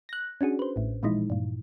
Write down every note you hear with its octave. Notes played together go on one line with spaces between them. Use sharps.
F#6 A#6
C#4 D4 F#4 G#4
B4 C5
A1 A2
A#2 E3 F3 G#3 D#4 E4
G2 A#2